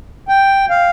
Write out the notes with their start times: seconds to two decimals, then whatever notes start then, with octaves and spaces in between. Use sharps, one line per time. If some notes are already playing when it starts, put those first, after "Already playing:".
0.28 G5
0.70 F5